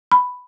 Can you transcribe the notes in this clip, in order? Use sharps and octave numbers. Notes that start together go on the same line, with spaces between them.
B5